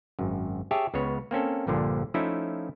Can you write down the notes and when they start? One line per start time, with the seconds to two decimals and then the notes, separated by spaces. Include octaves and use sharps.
0.19 G#1 F#2
0.71 G4 G#4 C#5 E5 A5
0.94 C#2 C#3 B3 C#5
1.31 A#3 C4 C#4 A4
1.67 A#1 G2 A#2 D3 F3
2.14 F3 A3 C#4 D#4 E4 E5